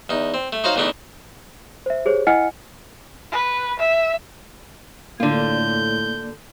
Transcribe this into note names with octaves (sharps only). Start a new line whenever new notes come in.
E2 D#4
C4
A3
D#4 F#4 C5 C#5 F5 A#5
E2 E3 A3 D4 D#4
C5 E5
G4 G#4 C5 C#5
E4 D#5 F#5 G#5 F6 C#7
B4
E5
A2 D3 A#3 F4 D5 G6